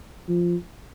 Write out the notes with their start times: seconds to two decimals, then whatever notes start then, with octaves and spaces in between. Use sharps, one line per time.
0.28 F3